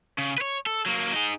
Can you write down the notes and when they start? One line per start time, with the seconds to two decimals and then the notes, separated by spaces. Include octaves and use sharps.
0.18 C#3
0.38 B4 C#5
0.66 A4
0.86 F#3 A#3
1.12 D#4 G#4